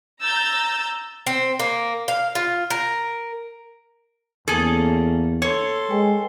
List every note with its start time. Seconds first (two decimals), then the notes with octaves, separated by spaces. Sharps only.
0.23 A#5 E6 G6 A6
1.27 C4
1.60 A#3
2.08 F5
2.35 F4
2.70 A#4
4.48 E2 A#3 C#4 G#4 A4
5.42 A4 C#5 C6
5.91 G#3 B4 G5 G#5